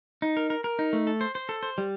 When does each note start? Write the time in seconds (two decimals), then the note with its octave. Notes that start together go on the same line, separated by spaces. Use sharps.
0.22 D#4
0.37 A#4
0.50 A#4
0.64 A#4
0.79 D#4
0.93 A3
1.07 A4
1.21 C5
1.35 C5
1.49 A4
1.63 C5
1.78 G3